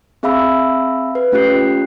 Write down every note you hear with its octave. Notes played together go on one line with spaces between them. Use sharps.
C4 G#4 E5 F5 B5 E6
B4
A3 C#4 F4 G4 F#6 C7